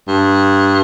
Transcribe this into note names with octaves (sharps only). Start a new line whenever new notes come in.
G2